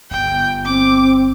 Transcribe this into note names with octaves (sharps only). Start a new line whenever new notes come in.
G1 G5
C4 D6